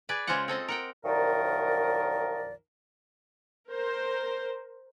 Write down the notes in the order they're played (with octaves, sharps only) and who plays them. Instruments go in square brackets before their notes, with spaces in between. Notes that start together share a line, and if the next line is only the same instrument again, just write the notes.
[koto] G#4 B4 D5
C#3 G#3 F4 F#4 C5 F#5
C4 A4 D#5 A5
A#4 F#5 G5
[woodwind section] C2 F#2 D#3 F3 A#4 D5
[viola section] A#4 C5